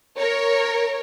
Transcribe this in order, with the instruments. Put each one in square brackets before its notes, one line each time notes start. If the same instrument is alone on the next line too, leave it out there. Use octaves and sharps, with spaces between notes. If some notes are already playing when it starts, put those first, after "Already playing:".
[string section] A#4 C#5